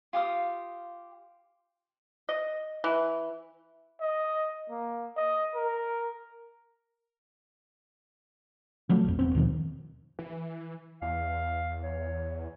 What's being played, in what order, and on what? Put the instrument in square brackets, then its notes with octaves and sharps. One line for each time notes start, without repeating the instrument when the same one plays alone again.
[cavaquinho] F4 G4 F5 D#6
[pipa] D#5
E3
[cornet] D#5
A#3
D#5
A#4
[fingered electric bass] F3 F#3 A3
A#1 F2
E1 B3 C4
D#2 B2 D#3 F3
[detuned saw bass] E3
[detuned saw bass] E2 [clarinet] F5
[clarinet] C#5